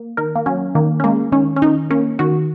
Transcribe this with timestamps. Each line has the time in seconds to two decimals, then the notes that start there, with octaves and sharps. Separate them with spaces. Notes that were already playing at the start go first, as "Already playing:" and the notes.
Already playing: A#3
0.17 D#3 A#4
0.35 A#3
0.46 F#3 C#4
0.75 D#3 A#3
1.00 C#4
1.04 G#3 A#3
1.32 D#3 C#4
1.56 C#4
1.62 D#3 D#4
1.90 A#3 C#4
2.19 D#3 F#4